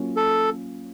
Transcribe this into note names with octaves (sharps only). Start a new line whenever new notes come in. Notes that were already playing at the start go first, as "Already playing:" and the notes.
Already playing: F#3 A#3 C#4 F4
A4